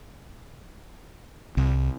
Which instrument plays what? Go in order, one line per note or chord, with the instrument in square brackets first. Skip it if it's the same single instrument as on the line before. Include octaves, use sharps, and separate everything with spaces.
[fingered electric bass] C2